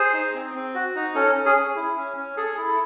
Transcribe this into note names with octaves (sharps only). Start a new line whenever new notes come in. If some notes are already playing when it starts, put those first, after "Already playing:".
Already playing: G#4 C5
D#4
C4
C4
F#4
D#4
C#4 A4
C#4
G#4
G#4
E4
C#4
C#4
G#4 A4
E4
A4